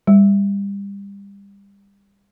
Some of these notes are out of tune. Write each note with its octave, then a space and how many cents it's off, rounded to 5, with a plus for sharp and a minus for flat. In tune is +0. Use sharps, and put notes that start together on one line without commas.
G3 +30